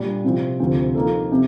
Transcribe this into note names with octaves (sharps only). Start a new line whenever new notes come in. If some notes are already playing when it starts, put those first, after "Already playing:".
Already playing: A#2 G3 D4
C3 F3 C4
D2 C3 F3 C4
F3 A#3 D#4 A4
C3